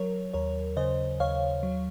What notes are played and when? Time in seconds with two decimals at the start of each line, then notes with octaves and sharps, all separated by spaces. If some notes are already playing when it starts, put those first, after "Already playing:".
Already playing: F#3 A#4 C#5
0.33 D#2 A#4 C#5
0.77 C#3 C5 D#5
1.20 D#2 C#5 F5
1.63 F#3